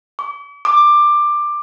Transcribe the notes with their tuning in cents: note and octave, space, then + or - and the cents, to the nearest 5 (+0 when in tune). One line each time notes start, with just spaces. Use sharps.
D6 -45
D6 +15